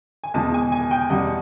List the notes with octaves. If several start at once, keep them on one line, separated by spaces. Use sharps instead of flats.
G#5
E2 B2 G#3 A5
G#5
G#5
G5
E2 B2 G3 F#5